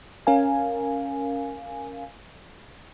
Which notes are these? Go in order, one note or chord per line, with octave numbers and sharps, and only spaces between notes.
C#4 A#4 F5 G#5